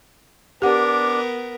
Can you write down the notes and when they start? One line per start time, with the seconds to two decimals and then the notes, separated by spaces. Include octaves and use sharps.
0.62 B3 D4 G4 A#4 F#5 D6